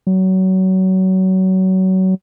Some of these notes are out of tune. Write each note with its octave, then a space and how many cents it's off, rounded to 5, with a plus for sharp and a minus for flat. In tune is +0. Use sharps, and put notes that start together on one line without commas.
F#3 +25